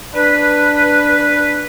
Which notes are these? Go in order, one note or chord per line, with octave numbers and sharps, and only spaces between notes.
D4 B4